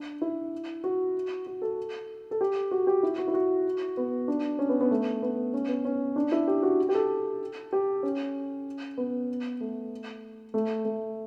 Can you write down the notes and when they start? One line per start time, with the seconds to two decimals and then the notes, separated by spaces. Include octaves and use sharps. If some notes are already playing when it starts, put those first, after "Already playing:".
Already playing: D4
0.22 E4
0.84 F#4
1.46 F#4
1.62 A4
2.31 A4
2.41 G4
2.71 F#4
2.87 G4
3.03 E4
3.18 F#4
3.28 E4
3.34 F#4
3.97 B3
4.28 D4
4.59 C#4
4.69 B3
4.81 B3
4.91 A3
5.22 B3
5.54 C#4
5.68 B3
5.85 C#4
6.16 D4
6.32 E4
6.47 G4
6.63 F#4
6.89 G4
6.95 A4
7.73 G4
8.03 C#4
8.97 B3
9.61 A3
10.54 A3
10.85 A3